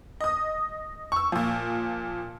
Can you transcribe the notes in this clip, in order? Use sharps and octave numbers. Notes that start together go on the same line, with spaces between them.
D#5 D#6
C#6 E6
A#2 F3